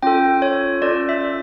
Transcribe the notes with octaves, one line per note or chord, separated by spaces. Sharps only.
C#4 F4 A4 G5
C#5
C#4 F4 A4 D5
E5